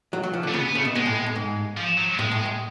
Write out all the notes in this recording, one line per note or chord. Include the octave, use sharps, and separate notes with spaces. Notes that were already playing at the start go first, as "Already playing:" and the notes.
F#3
F#3
F3
D3
A3
C#3 B3
B3
C#3 A3
B2
B2 G#3
A2
A2
G#2
F3
F#3
A2 G#3
A2
A2